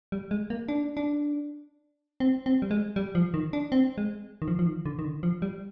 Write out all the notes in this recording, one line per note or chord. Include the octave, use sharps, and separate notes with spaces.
G3
G#3
A#3
D4
D4
C4
C4
G3
G#3
G3
F3
D#3
D4
C4
G#3
D#3
F3
F3
D#3
D3
D#3
D3
F3
G3